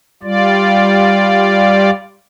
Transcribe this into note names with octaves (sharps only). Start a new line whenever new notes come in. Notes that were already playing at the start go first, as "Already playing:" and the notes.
G3 F4 D5